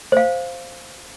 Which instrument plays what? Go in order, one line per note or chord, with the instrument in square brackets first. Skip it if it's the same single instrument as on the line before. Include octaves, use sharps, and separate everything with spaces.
[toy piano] C5 F5